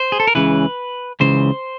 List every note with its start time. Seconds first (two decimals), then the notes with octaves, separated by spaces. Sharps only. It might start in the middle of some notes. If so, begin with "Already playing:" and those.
Already playing: C5
0.12 G#4
0.20 A4
0.27 A#4
0.35 C#2 C#3 E3 B4
1.20 C#2 C#3 E3 C5